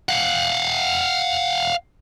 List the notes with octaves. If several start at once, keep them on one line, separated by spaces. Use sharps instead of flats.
F5 F#5